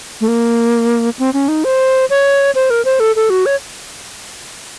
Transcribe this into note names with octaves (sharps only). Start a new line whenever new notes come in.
A3
A#3
C4
C#4
D#4
C5
C#5
C5
A#4
C5
A4
A4
F#4
C#5